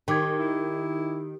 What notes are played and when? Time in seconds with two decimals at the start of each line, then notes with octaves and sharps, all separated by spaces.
0.08 D#3 G4 G5 D6 G#6
0.39 E4